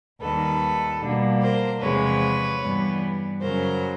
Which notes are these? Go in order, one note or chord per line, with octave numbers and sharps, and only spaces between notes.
D#2 D#3 G3 A4 B4
B2 G3 A#3 D4
A#4 C5
E2 C3 F3 G#3 B4 C#5
G2 E3 G3 B3
F#2 C#3 F#3 A#4 C5